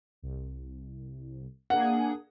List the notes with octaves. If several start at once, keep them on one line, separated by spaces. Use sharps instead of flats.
C2
A#3 D4 G#4 F#5